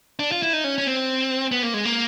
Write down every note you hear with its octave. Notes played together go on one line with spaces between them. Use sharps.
D4
F4
E4
D#4
C#4
C#4
C4
B3
A#3
G#3
A#3